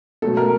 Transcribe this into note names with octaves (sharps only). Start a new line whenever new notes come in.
B2 F#3 A3 A4
A#4